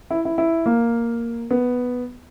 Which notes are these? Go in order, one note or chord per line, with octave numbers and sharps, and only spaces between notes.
E4
E4
E4
A#3
B3